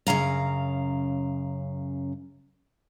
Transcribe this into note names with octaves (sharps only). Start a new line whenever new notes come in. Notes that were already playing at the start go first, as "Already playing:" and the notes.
F#2 C#3 F5 A#5